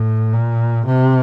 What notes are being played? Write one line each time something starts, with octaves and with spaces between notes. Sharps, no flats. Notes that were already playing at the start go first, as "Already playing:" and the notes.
Already playing: A2
A#2
C3